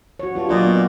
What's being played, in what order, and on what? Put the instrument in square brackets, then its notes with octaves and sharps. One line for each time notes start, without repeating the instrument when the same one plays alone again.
[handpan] F#4 C#5
[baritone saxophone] G2 [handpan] D4 F4
[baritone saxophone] A#2 [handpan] F#3 D5 D#5
[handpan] B3